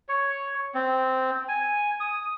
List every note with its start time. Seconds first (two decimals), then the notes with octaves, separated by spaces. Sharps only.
0.09 C#5
0.74 C4
1.49 G#5
2.00 D#6